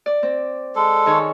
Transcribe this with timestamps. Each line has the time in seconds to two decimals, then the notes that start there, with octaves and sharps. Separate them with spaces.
0.06 D5
0.23 C4
0.76 G#3 A4
1.06 D#3 G#4 C#5